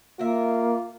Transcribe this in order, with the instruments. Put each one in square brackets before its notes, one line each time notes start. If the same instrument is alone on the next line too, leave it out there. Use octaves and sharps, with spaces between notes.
[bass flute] A#3 [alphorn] F4 [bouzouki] A#4 E5